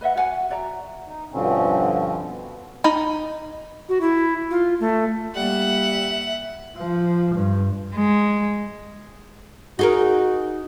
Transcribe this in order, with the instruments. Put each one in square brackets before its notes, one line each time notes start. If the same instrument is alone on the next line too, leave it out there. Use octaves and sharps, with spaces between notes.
[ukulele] B4 D#5 E5 F#5
F#4 E5 F#5 G#5
F#4 D5 E5 A#5
[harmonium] D#4
G2 B2 D3 F3 C4 C#4
B2
[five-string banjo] D#4 B5
[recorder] F#4
E4
F4
A3
[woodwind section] G3 A#3 [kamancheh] E5 [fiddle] F#5
[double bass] F3
G2
[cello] G#3
[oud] D#4 G#4 A#4 [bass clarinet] F#4